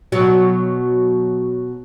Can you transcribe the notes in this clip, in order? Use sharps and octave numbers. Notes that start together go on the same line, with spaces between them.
B2 F#3 F#4